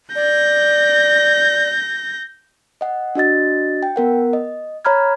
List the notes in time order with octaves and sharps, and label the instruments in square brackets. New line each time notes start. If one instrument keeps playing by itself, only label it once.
[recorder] D5 [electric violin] G6 A#6
[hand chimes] D#5 F#5
D4 F#4 D#5 A6
G5
B3 A#4 F#5
D#5
C#5 A#5 B5 F6 G#6